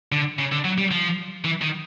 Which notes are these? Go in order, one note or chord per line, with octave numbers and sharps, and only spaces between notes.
D3
C#3
D3
F#3
G3
F3
E3
D#3